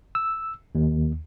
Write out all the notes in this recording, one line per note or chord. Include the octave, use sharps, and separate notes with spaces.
E6
D#2